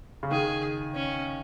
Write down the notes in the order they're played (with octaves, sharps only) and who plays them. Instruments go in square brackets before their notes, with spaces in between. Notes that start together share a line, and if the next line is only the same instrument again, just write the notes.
[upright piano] C#3
[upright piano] D#3 [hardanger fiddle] G#4
[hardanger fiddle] C#4